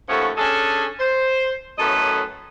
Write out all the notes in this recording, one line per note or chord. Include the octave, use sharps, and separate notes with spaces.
D#2 F3 A3 C#4 A4 F#5
C#4 D4 G#4 A4
C5
F#2 A2 C#4 A4 B4 D#5